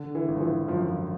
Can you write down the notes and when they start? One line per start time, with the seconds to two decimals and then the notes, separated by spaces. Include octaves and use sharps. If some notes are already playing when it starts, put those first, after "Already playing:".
Already playing: D3
0.15 E3
0.28 G#1
0.37 F3
0.41 E3
0.68 F#2 F3